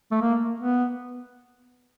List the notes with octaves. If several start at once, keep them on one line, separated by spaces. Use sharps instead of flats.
A3
A#3
B3